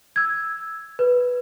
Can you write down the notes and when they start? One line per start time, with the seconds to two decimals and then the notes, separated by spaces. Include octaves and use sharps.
0.16 E6 G#6
0.99 B4